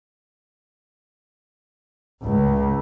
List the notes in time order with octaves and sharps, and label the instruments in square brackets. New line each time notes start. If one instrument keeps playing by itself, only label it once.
[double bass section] C#2